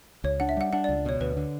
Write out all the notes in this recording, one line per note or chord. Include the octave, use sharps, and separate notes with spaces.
C#2 C#5
D4 F#5
E5
G3 F#5
D4 F#5
D5
C#2
B2 C#5
D2 B4
D3